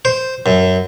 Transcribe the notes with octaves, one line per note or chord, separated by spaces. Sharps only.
C5
F#2